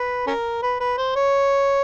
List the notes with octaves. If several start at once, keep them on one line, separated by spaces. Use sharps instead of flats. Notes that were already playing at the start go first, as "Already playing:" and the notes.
Already playing: B4
C#4 A#4
B4
B4
C5
C#5